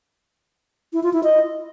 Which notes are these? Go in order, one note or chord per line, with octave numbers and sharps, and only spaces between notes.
E4
F4
E4
D#5